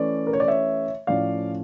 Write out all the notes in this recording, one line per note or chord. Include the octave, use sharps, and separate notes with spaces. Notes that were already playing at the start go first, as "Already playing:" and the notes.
Already playing: E3 A3 C#4 D5
A#4
C#5
D5
C#5 E5
A2 F3 C#4 D5 F5